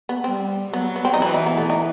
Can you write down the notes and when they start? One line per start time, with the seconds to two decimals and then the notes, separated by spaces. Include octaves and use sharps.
0.09 B3
0.24 G3 C4
0.73 F#3 B3
0.96 B3
1.05 C4
1.14 D#4
1.21 E3 E4
1.34 D#4
1.46 B3
1.57 A3
1.70 D#4